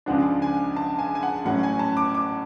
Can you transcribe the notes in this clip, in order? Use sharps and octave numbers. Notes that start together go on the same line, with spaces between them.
C#2 C#3 F3 G#3 D4 F#5
G#5
A5
G#5
G#5
F#5
A1 A2 F#3 C#4 F#5
G#5
A5
D6
D6